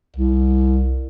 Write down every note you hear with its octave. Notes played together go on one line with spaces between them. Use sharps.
C2